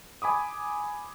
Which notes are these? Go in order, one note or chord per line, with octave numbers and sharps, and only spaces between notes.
G#5 B5 D6 D#6